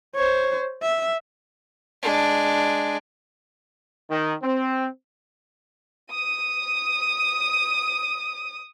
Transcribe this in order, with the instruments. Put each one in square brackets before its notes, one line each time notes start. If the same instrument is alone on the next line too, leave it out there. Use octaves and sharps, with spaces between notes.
[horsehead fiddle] C5 C#5
E5
[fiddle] G#3 D4
[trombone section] D#3
C4
[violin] D#6 D#7